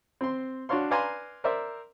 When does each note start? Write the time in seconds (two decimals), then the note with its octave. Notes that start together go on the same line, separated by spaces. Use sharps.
0.21 C4 C6
0.69 D4 F#4 C#5 F5 C6
0.91 B4 D5 F5 G#5 A#5 C6
1.44 A#4 C5 D5 E5